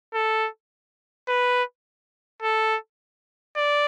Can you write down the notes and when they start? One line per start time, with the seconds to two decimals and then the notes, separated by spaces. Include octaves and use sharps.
0.14 A4
1.29 B4
2.43 A4
3.56 D5